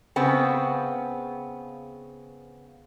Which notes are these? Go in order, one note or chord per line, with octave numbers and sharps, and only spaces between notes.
C#3 B3 C4